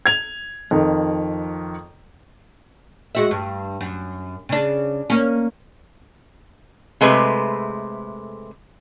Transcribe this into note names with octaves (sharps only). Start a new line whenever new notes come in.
G#6 F7
F2 D#3
G#3 F#4 E5
G2
F#2
C#3 D4
A#3 C#4
C3 G#3 A3 B4